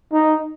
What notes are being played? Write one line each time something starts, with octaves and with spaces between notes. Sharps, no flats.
D#4